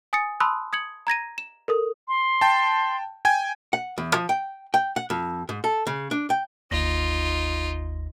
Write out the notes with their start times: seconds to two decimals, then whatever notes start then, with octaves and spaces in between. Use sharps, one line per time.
0.13 G#5 D#6 A6 C#7
0.40 A5 B5 C6 D#6 E6 F#6
0.73 D#6 G#6 C#7 F#7
1.07 A#5 G#6 A#6 D#7
1.38 E7
1.68 A4 A#4 D#6
2.08 C6
2.41 G5 A5
3.25 G5 G#5 G#6
3.73 F#5
3.98 E2
4.14 F3
4.29 G5
4.74 G5
4.96 F#5
5.10 F2
5.49 G#2
5.64 A4
5.87 C#3
6.11 D4
6.30 G5
6.71 G1 D#2 D#4 F4 A#6